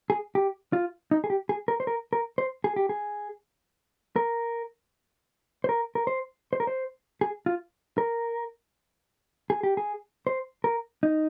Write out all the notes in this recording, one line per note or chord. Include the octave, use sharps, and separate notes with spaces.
G#4
G4
F4
D#4
G#4
G4
G#4
A#4
C5
A#4
A#4
C5
G#4
G4
G#4
A#4
C5
A#4
A#4
C5
C5
A#4
C5
G#4
F4
A#4
G#4
G4
G#4
C5
A#4
D#4